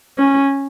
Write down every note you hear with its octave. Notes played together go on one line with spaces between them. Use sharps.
C#4